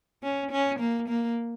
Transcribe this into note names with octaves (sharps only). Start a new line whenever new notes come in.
C#4
C#4
A#3
A#3